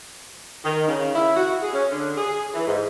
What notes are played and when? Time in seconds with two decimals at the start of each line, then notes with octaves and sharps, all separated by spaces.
0.65 D#3
0.88 C#3
1.15 E4
1.37 F#4
1.62 G#4
1.73 C#4
1.92 D3
2.17 G#4
2.54 E3
2.68 G#2